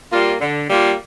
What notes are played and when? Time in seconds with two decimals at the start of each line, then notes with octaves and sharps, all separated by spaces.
0.12 G3 A#3 F4
0.41 D3
0.69 G3 A#3 F4